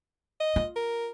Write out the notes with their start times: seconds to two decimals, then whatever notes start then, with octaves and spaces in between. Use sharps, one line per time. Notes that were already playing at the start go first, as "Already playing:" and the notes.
0.40 D#5
0.56 F4
0.76 A#4